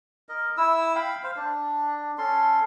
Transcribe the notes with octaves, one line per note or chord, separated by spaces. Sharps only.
A#4 D#5
E4 E6
F5 G5 B5
C5 F5
D4
C#4 A4 C6